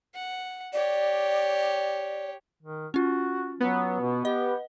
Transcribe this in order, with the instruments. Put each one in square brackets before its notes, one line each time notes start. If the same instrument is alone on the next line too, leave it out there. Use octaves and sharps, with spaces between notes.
[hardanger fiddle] F#5
[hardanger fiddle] G4 C#5 [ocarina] D5
[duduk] D#3
[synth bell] C#4 F4 [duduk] F#4
[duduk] F#3 [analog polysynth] B3
[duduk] B2
[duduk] G4 [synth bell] D#5